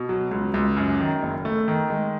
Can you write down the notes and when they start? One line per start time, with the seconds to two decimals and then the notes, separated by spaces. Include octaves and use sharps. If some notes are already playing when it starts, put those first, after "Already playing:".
Already playing: B2
0.09 F#3
0.31 C#2
0.54 C#2
0.77 F#2
1.00 D#3
1.23 F#1
1.45 A3
1.68 D#3
1.90 G#3